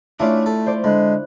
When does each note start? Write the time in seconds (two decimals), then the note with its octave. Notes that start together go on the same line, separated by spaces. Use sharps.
0.20 A3 C#4 D4 E4 F4 D5
0.46 A4
0.66 C5 D5
0.84 D3 G#3 B5 F#6